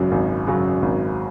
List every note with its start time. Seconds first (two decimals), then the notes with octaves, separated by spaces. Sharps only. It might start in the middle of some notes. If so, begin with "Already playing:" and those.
Already playing: G#1 F#2 C#3 F#3
0.12 G#1
0.47 F#2 C#3 F#3
0.82 G#1